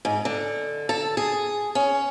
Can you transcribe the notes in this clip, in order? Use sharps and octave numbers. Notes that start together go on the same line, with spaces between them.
G#2
D3
A4
G#4
C#4